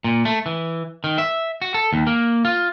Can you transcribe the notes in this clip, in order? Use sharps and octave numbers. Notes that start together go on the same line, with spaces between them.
A#2
A3
E3
D#3
E5
F#4
A4
D#2
A#3
F4